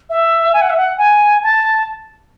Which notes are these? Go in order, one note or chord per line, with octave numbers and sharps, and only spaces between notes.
E5
G#5
F#5
E5
F#5
G#5
A5